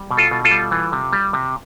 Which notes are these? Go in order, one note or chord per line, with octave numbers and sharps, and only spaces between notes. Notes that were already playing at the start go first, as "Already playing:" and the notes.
Already playing: G3
B2
F4 A4
B2
F4 A4
G3
E3
C3
G3
C3